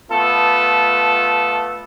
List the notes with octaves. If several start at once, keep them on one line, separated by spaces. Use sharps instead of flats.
A3 B3 F4 A4